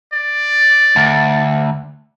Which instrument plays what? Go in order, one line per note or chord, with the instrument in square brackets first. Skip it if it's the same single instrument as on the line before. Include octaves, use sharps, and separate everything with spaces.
[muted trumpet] D5
[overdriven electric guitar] D2